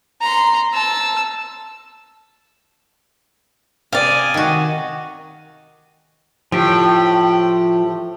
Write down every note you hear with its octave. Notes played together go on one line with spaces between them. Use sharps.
A#5 C6
A5 E6
C3 D5 D#5 F5 G#5
D#3 F#4
A2 F3 G4